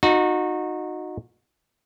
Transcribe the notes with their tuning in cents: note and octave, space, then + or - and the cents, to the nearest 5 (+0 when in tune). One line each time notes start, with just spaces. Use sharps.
D#4 -10 F#4 -25